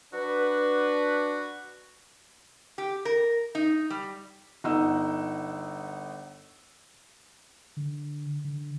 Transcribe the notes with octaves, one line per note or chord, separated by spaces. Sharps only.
D4 F#4 B4
G4
A#4
D#4
G3
G1 D#4 F#5 E6
D3
D3